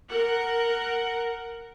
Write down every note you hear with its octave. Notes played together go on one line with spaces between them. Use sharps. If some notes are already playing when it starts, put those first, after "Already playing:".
A#4 F#5